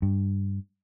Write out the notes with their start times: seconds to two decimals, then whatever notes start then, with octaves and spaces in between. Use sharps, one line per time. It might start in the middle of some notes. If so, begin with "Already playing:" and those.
0.02 G2